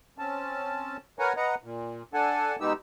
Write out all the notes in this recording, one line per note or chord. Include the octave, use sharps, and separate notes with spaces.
C4 C#4 A5
A#4 B4 C#5 F#5 G#5 A#5
B4 D#5 F#5 A#5
A#2
D4 A4 F#5 G#5 A5
B2 G#3 B3 D#4 G4 E6